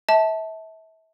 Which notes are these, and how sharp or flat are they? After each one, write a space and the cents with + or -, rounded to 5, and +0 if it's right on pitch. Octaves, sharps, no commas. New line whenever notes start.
E5 -30 A5 -5